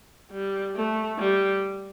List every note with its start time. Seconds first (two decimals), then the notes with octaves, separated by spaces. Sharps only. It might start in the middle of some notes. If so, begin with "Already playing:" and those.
0.31 G3
0.76 A3
1.19 G3